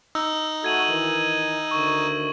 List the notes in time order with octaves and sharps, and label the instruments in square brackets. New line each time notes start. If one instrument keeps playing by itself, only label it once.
[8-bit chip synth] D#4 [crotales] E6
[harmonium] A3 F#4 A4 [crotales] G#6 D#7 F#7
[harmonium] D#3 E3
[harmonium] D2 D#3 [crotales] C#6